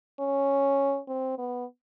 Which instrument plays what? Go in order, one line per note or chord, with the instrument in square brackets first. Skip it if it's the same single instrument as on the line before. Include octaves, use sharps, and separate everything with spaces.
[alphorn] C#4
C4
B3